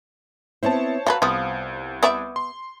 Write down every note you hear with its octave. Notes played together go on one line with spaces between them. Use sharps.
B3 C4 E4 C5 C#5 A5
F#3 A4 B4 F5
C2 F3 B3
B3 D5 E5
C6